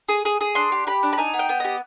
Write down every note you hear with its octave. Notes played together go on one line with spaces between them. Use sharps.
G#4
G#4
G#4
D4 C6
G4
G4 B5
D4
B5
D#4 G#5
B3
G5
B3
G4 D#5